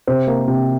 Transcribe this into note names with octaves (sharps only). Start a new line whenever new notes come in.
C3 C5
A#3
C3